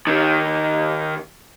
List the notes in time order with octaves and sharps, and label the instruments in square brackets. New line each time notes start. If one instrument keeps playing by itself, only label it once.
[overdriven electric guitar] D#2 D#3